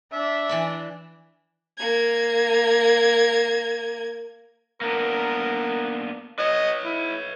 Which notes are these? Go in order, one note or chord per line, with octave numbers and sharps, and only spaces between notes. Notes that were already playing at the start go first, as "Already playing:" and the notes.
D4 E5
E3 D5 B5
A#3 G#6
A#3 B3 D4 A#4
B4 C#5 D#5
E4